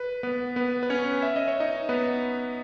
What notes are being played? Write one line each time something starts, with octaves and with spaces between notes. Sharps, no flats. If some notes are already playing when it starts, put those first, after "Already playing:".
Already playing: B4
B3 B4
B3 B4
B4
C#4 C#5
E5
D#5
C#5
D#4 D#5
B3 B4